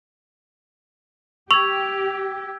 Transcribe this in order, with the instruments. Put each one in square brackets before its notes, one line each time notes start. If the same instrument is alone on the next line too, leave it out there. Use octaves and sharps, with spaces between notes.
[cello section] G4 [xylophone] C#6 [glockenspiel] E6 G#6 [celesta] F7